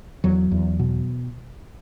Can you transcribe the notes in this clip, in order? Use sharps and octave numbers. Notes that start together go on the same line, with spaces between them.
E2 F#3
E2
B2